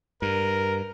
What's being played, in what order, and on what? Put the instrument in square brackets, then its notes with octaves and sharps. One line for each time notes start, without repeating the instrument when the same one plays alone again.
[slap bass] G2 [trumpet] A#4